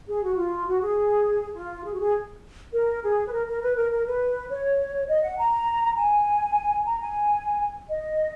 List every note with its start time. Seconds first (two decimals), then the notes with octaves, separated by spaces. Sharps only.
0.08 G#4
0.23 F#4
0.37 F4
0.67 F#4
0.82 G#4
1.55 F4
1.85 G#4
1.94 F#4
2.00 G#4
2.73 A#4
3.03 G#4
3.27 B4
3.32 A#4
3.47 A#4
3.62 B4
3.76 A#4
3.91 A#4
4.06 B4
4.50 C#5
5.09 D#5
5.23 F#5
5.39 A#5
5.98 G#5
6.86 A#5
7.00 G#5
7.89 D#5